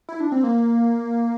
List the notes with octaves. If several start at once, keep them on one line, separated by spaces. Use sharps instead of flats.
E4
D4
C4
A#3